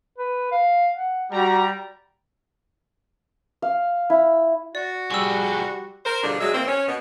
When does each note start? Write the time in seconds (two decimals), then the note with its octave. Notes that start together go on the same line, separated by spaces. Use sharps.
0.18 B4
0.52 F5
0.95 F#5
1.32 G3 F#4 A#5
3.62 F5
4.10 E4
4.75 F#4 D5
5.11 F3 G3 G#4 C#6 E6
6.05 A#4 C5
6.23 E2 B2 D3 F3 G3 D4
6.41 F#3 G#3 E5
6.53 B2 E3 A#3 C4
6.67 C#4
6.88 B2